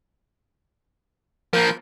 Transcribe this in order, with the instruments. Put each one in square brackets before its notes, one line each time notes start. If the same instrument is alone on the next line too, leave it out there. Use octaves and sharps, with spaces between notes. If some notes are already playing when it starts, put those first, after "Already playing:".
[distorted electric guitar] F3 A#3 [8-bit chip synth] A#4 G6